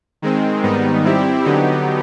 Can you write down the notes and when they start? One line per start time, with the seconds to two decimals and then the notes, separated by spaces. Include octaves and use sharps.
0.22 D#3 G#3 C4
0.63 G#2 D#3 G3 B3 D#4
1.04 G3 C4 E4 G4
1.44 D3 F#3 B3 D#4 G4